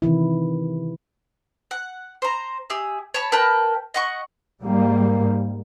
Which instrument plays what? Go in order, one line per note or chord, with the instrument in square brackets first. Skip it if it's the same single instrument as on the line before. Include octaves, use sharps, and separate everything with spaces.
[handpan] C3 D#3 E3 E4
[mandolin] F#5
C5 A#5
G4 G#4 E5
C#5 A5 B5
A#4 B4 G5 A5
D#5 F#5 C#6
[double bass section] G#2 G3 A#3